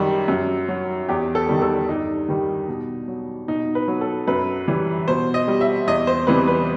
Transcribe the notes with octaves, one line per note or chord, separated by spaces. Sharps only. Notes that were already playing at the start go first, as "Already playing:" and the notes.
Already playing: F#2 D#3 G3
F#2
F#3
E2 G4
A4
D#3 G3
A4
G2 D#4
D#3 G3
B2
F#3
B2 D#4
B4
F#3
A4
F#2 B4
E3 G3
B2 C5
D#5
G3
E5
E2 D#5
C5
C3 E3 G3 B4
B4